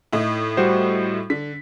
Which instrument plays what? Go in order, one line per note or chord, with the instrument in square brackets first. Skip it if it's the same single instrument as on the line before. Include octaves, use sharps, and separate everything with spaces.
[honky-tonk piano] A2 D#4 E4
[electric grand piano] G3 F#4 C5
[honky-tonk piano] D3 [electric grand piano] B6